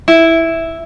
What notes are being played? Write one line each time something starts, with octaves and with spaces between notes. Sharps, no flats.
E4